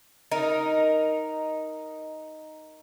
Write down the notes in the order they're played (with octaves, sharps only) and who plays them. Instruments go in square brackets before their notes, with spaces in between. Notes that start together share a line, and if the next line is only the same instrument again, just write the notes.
[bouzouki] D#4 A#4